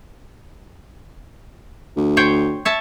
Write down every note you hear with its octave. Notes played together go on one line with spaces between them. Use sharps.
D2
C5 C#5 G5
C#5 E5 A5